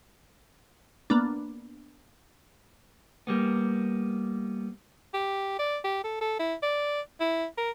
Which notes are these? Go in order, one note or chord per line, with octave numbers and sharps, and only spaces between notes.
A#3 B3 D4
G3 A#3 B3
G4
D5
G4
A4
A4
E4
D5
E4
A#4